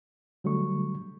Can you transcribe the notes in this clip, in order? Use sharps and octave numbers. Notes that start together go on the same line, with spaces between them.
D3 F#3 G3 A3 C#6